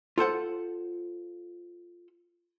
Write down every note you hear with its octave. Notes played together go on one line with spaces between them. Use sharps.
F4 A4 C5 F#5